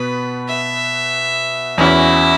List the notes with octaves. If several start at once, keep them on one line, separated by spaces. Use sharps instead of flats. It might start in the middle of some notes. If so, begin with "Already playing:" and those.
Already playing: B2 B3 B4
E5
E2 E3 C#4 E4 F#4